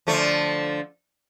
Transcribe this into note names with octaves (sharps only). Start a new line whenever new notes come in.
D3 F3 A3